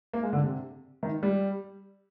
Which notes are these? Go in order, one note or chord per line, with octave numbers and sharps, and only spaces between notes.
A#3
G#3
D3
C3
D#3
G3